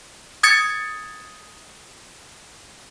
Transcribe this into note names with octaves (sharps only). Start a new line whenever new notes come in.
D#6 G#6 A6 C#7